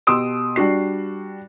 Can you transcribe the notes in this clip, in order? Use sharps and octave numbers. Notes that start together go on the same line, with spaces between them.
B2 G4 C6 D#6 E6 D7
G3 D4 F#4 C7